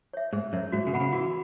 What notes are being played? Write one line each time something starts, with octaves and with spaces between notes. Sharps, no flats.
C#5 E5
G#2 G#4
F#2 C#5 E5
G#2 F#4
C#3
B2 B4 F#5 B5
C#3
E3 F#4